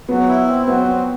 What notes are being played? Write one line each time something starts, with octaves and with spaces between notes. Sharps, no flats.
F#3 B3
E4
C4
F#3 B3
C4